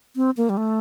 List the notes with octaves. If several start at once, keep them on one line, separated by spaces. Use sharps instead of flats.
C4
A#3
G3
A3